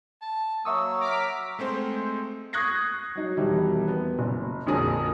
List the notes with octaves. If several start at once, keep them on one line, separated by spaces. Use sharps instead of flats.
A5
F#3 A#3 E5 C#6 D#6 E6
A#5 D6 F6 B6
G#3 A3 C4 C5
C#6 D#6 F#6 G#6 A#6 C7
F#3 D#4
E1 B2 D#3 G3 E5
B3
F#1
A#1 F2 D3 G#4 A#4 A#5